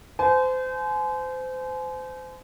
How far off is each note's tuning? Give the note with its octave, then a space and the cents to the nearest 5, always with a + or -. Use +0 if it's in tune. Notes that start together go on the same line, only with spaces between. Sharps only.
C5 -30 G#5 +35